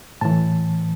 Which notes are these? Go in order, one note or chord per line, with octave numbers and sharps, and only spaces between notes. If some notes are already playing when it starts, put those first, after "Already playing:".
A2 E3 A5